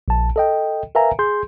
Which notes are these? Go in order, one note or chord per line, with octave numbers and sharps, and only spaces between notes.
A#1 A5
A4 D#5 G5
A#4 B4 E5 F5 G#5 A#5
G#4 C6 G6